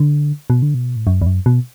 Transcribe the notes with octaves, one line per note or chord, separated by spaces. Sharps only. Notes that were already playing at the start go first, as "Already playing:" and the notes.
Already playing: D3
B2
D3
B2
A2
F#2
E2
F#2
B2